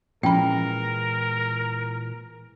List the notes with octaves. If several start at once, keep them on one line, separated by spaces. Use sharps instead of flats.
A#2 E3 F3 G#3 C#4 A#4 G5 B5